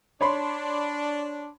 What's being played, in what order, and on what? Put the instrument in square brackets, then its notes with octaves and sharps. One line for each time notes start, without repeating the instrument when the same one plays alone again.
[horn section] D4 [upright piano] C#5 B5 C6